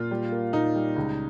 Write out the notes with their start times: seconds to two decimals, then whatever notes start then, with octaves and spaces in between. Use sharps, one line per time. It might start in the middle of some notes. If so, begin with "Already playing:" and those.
Already playing: A#2 F4
0.11 G3
0.32 A#3
0.53 A#2 D#4
0.75 G3
0.96 C#2